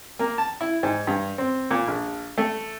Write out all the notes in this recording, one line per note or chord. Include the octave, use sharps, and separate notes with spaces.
A#3
A5
E4
G#2
G2
C4
A#2
A#1
A3